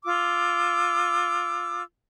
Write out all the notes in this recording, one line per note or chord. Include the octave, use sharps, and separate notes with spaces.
F4 D6 E6